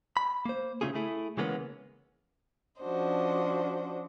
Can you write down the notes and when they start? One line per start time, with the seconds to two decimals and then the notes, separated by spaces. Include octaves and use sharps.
0.17 B5
0.46 A#3 C5
0.81 C#3 E3 A3 C#4 F4 G#4
0.95 A3 E4 G#4
1.37 C#3 E3 G#3 A#3 B3 C#4
2.81 F3 C#4 D4 F#4 C5 D#5